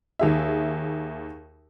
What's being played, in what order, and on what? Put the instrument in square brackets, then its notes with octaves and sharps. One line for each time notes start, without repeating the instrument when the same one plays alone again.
[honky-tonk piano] D#2 G#4 E5